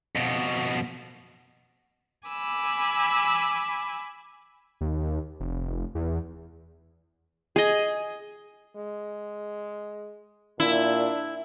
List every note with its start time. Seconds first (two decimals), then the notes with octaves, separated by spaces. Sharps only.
0.15 F2 B2
2.28 G#5 B5 D6 E6
4.81 D#2
5.40 F1
5.95 E2
7.56 G#4 D#5
8.77 G#3
10.60 A#2 D4 E4